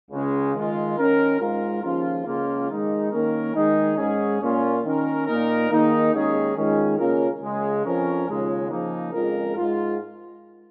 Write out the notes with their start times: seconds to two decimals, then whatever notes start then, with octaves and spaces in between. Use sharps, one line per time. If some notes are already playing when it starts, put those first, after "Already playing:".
0.10 C#2 C#3 G#3
0.53 D#3 G#3 F4
0.96 D#3 C#4 A#4
1.40 G#2 G#3 F4 A#4
1.82 D#2 C#3 F3 C#4 F4
2.25 C#2 C#3 A#3 F4
2.68 D#3 G#3 D#4
3.11 D#3 A#3 C#4 A#4
3.54 D#3 G#3 D#4 G#4
3.97 G#2 G#3 C#4 G#4
4.40 A#2 A#3 C#4 F4
4.83 D#3 C#4 A#4
5.26 A#2 A#3 D#4 A#4
5.69 D#3 A#3 D#4 G#4
6.12 D#2 D#3 G#3 C#4 G#4
6.55 D#3 G#3 C#4 F4
6.98 C#3 A#3 C#4 F4 A#4
7.41 C#2 C#3 G#3
7.84 F2 F3 C#4 A#4
8.27 D#2 C#3 G#3 F4
8.70 C#3 F3 A#3 D#4
9.13 F2 C#3 G#3 F4 A#4
9.56 G#2 G#3 F4